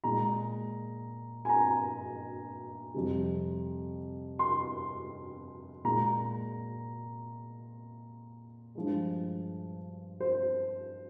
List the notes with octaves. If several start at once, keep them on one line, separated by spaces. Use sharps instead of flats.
A#2 G#3 A#5
G#5
A#5
F2 C3 G3
C6
A#2 G#3 A#5
G2 F3 G#3
C5